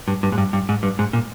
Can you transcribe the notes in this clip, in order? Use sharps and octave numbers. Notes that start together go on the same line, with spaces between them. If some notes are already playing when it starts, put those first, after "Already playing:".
G2
G2
G#2
G2
G2
G#2
G2
G#2
A#2